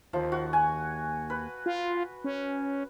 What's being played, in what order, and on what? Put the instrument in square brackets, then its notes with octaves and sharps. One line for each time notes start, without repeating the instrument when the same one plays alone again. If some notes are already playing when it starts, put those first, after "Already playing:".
[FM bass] D#2 [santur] F3
[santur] F#4
G#5
B4
[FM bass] F4
C#4